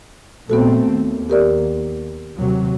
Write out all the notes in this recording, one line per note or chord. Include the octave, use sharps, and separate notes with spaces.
A#1 A3 B3 C4 F#4 A4
D#2
G4 A#4 D5
D#2 C3 F#3